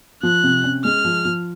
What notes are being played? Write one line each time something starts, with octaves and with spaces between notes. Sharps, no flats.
F3 F#6
C3
C#4
G#3 F6
F3
F3